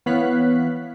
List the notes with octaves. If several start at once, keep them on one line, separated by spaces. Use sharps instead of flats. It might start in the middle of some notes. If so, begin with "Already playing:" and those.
E3 B3 C#5 F5 F#6 B6